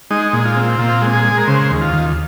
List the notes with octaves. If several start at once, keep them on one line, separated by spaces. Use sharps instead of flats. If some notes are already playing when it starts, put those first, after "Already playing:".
G#3 D#4
A#2
F4
C4
A#2 F4
G#3
G#4
G#3
A#4
C#3 C5
D#2
F4
D#2